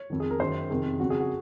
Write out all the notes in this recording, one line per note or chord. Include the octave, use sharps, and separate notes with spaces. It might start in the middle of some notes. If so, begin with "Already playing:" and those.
Already playing: C#5
F2 D#3
G#4
A#4
F#2 D#3 C5
F2 C3 D#3 G#4
F2 C#3 F#4
G#4
F#4